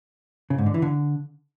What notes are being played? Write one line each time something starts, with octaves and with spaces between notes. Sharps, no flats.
C#3
G#2
D3
E3
D3